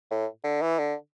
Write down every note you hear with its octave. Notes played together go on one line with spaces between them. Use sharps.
A2
D3
E3
D3